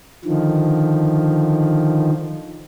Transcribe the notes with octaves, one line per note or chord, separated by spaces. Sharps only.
D3 D#3 F3